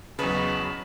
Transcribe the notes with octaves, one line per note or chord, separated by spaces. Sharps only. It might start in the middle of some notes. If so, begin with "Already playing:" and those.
E2 C#3 F#3 B4 D#5 A5 B5 C#6